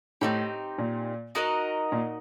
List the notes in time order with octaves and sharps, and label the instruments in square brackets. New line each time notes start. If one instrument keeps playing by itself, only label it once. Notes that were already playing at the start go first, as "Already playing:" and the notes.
[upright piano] A2 [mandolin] C4 D#4 G4
[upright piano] A#2
[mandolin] D#4 F#4 A#4 D#5
[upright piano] A#2